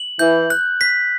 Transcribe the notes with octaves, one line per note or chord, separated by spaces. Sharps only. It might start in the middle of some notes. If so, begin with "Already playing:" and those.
Already playing: F#7
E3 G6
F#6
B6